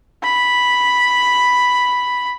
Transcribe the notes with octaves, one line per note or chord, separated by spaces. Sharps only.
B5